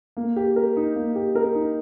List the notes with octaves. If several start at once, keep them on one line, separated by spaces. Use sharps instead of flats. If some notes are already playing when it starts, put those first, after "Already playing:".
A#3
G4
A#4
D#4
A#3
G4
A#4
D#4